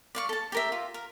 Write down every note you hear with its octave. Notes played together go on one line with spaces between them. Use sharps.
D5 F5 C#6
A4 A5
G4 A#4 E5
F4
A#4